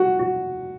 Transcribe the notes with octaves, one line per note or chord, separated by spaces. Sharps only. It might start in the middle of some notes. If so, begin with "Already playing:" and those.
Already playing: F#4
F#4